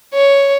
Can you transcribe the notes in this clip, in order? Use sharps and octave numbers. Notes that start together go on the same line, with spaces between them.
C#5